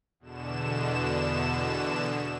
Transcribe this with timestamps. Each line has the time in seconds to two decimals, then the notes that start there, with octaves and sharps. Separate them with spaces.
0.20 E2 B2 D3 E7